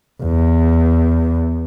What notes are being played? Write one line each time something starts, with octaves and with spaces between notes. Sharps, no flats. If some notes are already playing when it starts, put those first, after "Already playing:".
E2